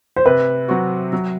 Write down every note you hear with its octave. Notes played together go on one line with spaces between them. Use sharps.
C5
C3 B4
F#3 C4 F#4
F#3